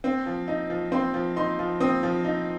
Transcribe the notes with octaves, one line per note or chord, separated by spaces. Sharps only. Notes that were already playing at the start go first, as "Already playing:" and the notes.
C4
F3
D#4
F3
C4 C6
F3
D#4 C6
F3
C4 D#6
F3
D#4